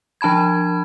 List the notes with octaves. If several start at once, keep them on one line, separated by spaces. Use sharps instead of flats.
F3 D4 A5 B5 G#6